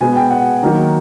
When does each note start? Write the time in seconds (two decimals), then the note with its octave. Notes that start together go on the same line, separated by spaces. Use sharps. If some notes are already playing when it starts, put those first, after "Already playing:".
0.01 B2 G#3 B3 G#5
0.16 G5
0.31 F#5
0.62 D#3 F#3 A#3 D#4